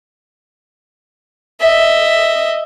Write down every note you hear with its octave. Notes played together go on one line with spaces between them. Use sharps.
D#5 E5